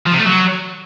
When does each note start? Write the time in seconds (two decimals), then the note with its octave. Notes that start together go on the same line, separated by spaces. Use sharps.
0.07 F3
0.13 C3
0.19 A3
0.26 F#3